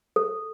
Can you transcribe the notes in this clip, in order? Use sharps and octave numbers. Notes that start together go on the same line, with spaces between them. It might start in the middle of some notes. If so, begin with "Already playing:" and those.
A4